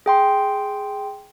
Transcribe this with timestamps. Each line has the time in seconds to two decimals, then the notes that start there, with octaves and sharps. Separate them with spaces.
0.06 G#4 G5 C6